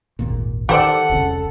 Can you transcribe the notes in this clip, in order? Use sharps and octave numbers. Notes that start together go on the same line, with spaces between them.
G#1 D#2 A#2
D#3 G4 A4 C5 D5 F#5
E1 C2 C#3